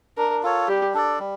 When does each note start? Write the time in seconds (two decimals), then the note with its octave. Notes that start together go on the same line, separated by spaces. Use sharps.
0.17 D4 A#4
0.43 F4 A4 C#5
0.68 G3 G4
0.94 D4 A4 D5
1.19 G3